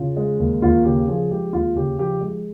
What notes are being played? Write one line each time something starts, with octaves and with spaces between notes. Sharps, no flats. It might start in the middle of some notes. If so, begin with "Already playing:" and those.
Already playing: C#3 F4
G#3
D#2
D#2 F4
C#3 G4
F3 G#4
G#3 G4
D#2 F4
C#3 G4
F3 G4
G#3